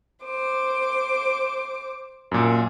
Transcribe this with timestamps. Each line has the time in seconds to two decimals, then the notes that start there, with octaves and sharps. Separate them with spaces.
0.24 C5 D6
2.31 F#2 A#2